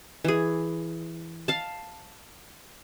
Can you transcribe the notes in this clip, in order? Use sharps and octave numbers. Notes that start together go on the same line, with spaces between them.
E3 G#4
F5 A5